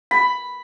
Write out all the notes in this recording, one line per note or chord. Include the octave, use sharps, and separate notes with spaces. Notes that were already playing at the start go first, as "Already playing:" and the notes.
B5